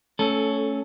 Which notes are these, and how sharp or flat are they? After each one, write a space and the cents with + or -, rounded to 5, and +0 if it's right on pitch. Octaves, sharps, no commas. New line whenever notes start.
A3 +0 C#4 +0 A4 -15